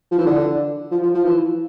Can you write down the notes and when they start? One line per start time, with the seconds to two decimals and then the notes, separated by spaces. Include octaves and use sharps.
0.11 F3
0.18 E3
0.26 D3
0.91 F3
1.03 F3
1.15 F3
1.25 E3